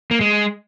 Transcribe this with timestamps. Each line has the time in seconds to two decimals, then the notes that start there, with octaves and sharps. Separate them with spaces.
0.11 A#3
0.21 G#3